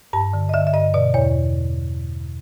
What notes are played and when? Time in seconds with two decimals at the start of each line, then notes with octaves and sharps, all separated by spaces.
0.13 G2 A5
0.33 D3
0.49 D#5
0.54 D3 E5
0.67 E5
0.73 G2 D#5
0.94 B2 D5
1.14 E2 C#5